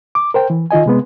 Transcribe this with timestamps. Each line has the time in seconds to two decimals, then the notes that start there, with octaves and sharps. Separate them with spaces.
0.15 D6
0.34 A#4 C5 G5
0.50 E3
0.71 D#3 F4 D#5 G#5
0.86 C3 G#3 B3